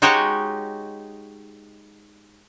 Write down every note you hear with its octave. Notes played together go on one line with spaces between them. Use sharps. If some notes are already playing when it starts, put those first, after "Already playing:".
G#3 D#4 F#4 G4 C#5